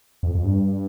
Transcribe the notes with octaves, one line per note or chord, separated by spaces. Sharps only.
F2
F2
G2